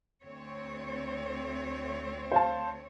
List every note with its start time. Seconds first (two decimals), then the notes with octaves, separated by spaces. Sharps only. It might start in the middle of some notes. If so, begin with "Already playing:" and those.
0.23 D2 C4 C#5
2.32 C5 F5 A5